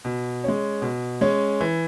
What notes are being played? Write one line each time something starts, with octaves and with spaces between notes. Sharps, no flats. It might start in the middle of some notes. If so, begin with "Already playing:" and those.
B2
G#3 C#4
B2
G#3 C#4
E3